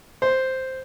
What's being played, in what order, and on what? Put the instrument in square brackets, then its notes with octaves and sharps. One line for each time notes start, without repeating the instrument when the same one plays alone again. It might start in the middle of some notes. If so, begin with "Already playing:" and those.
[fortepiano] C5